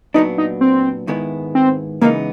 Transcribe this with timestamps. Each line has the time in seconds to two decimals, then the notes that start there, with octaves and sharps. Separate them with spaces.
0.14 A#2 F#3 B3 D4 D#4
0.38 D#4
0.61 C4
1.07 G#2 D#3 G#3 B3 E4
1.55 C4
2.01 C#3 E3 G#3 A#3 B3 D#4